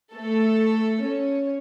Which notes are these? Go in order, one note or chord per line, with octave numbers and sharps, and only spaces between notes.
A3 A4
C#4 C#5